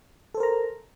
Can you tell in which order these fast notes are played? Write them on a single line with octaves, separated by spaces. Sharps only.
A4 C5 A#4 A#5